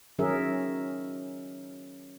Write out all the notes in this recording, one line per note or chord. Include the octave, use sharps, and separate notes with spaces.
D#3 F#3 C#4 G#4 A#4 E5